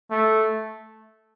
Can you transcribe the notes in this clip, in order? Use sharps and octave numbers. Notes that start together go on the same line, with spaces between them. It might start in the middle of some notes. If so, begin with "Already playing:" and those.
A3